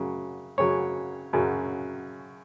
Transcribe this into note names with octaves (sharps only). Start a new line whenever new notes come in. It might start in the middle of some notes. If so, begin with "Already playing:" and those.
Already playing: F#2 C#3 F#3
F#2 C#3 F#3 C#5
F#2 C#3 F#3